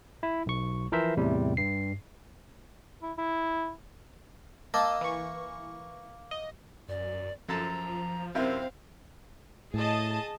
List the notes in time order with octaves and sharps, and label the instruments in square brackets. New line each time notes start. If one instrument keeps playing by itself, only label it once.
[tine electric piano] E4
B1 C#6
E3 F3 A#4 C5 E5
E2 A2 C3 G3
G2 C7
[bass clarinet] E4
E4
[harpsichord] A#3 [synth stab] D#5 A5 E6
[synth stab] E3 C#6
D#5
[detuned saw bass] F#2 [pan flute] D5
[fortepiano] F#2 A4 A5 [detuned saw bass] F3 [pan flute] A#5
[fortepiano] F#2 C3 E4 [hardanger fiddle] C4 F5 [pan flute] A#4
[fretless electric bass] A2 [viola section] G#4 D#5 A5